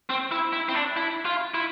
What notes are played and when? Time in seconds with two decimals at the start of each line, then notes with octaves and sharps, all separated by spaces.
0.10 C4
0.31 E4
0.53 E4
0.69 C4
0.75 D4
0.97 E4
1.25 F4
1.54 E4